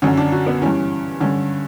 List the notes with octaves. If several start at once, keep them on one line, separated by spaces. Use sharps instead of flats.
F#2 D3 C#4
D4
F#4
B3
G2 E3 C#4
G2 D3 C#4